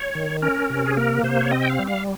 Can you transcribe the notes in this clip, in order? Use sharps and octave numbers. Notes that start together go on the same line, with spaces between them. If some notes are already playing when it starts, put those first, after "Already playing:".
Already playing: C#5
D#3
C#4 A#4
C3
G#4
A#3 A#4
C3 C5
C#5
C4 D#5
G5
F5
G3
F5